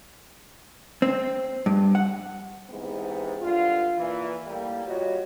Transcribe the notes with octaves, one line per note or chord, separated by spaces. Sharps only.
C4
G2
F#5
G#2 C3 E3 G#3 B3
G2 D3 F4
A#2 E3
A2 G3 A#3
G3 F4 F#4 C#5 D#5